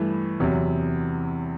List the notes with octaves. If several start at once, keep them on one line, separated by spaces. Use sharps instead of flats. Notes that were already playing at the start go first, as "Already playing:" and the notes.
Already playing: G2 E3 A3
E2 C3 F#3